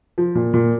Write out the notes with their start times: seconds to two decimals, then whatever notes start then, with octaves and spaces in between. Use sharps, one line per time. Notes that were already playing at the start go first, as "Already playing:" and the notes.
0.18 F3
0.35 A#2
0.54 A#2